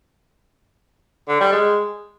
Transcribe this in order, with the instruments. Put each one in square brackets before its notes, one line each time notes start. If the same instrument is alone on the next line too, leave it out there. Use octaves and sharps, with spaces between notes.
[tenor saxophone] D3
G3
G#3